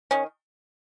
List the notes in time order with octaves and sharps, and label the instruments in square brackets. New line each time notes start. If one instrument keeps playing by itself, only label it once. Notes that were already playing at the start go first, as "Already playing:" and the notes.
[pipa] D#3 C#4